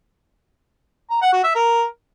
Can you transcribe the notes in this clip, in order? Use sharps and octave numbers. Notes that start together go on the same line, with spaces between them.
A#5
F#5
F#4
E5
A#4